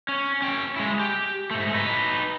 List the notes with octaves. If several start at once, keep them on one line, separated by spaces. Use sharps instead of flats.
C#4
C#4 G5
G#3 E4
G4
G#2 A3
D#4 B4